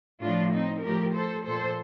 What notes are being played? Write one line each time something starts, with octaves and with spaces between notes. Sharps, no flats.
A2 F3 D4 F4
C4 D#4
A2 F3 G4 A#4
A4 C5
A#2 F3 A4 C5